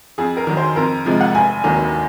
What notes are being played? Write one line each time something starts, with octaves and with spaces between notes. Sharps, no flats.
F2 G#4
A#4
D#3 F#3
C5
F2 A#4
C3 F3 G#3
F#5
F1 G#5
D#2 D#3 F#3